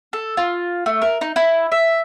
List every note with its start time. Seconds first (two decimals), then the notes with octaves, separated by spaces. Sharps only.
0.13 A4
0.37 F4
0.86 A3
1.02 A#4
1.21 D#4
1.36 E4
1.72 E5